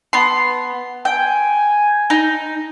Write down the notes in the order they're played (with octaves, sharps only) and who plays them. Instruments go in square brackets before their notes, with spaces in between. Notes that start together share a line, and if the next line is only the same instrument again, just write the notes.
[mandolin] B3 C6
[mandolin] G5 [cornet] G#5
[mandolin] D#4